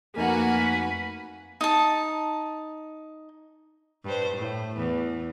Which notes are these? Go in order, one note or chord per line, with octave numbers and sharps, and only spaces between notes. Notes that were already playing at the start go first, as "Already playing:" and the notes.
F2 A3 A#3 D#4 F#4 B4 F#5 G#5
D#4 A5
G2 C5
A2
E2